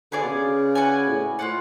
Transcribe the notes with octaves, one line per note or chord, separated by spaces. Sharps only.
D3 B3 F4 G#4 D5
B2
C#3
F#4 B4 D5 G#5
A2
A2 F4 B4 D5 F#5